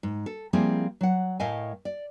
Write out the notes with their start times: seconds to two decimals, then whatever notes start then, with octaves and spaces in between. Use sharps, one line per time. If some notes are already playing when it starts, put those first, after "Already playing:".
0.03 G#2
0.26 A4
0.53 F3 G3 A#3 C4 E4 G#4
1.01 F#3 F#5
1.40 A2 A3 A#4 D#5 F5 G#5
1.85 D5